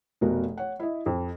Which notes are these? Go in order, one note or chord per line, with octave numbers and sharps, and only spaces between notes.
F1 B2 F#4 A#4
C#5 F#5
E4 D#5
F2